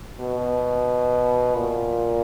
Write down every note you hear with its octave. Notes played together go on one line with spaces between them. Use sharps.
B2
A#2